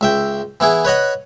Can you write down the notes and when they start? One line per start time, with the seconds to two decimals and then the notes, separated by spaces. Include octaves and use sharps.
0.01 C#2 E5 G5
0.60 E3 B3 E4 G#4
0.85 B4 C#5 D#5 F#5